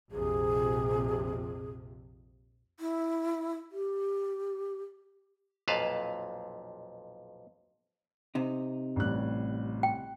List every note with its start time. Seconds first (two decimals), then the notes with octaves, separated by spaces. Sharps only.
0.11 A#1 F2 C3 G#4
2.79 E4
3.72 G4
5.68 B1 F2 A#2 B4 F5 A5
8.35 C3 D#4
8.96 A1 G3 F#6
9.83 G5